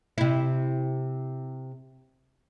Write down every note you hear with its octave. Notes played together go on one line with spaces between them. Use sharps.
C3 E4